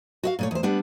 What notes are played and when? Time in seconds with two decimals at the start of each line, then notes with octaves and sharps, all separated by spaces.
0.23 F#4 E5 F5
0.39 A#2 A3 C#5
0.51 E2 C5
0.63 G3 B3 D4 F#5